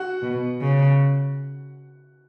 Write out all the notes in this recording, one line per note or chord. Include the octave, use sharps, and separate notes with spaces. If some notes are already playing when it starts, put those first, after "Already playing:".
Already playing: F#4 F#5
B2
C#3